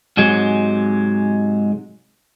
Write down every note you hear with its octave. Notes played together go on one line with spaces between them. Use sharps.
G#2 C3 F#3 G#3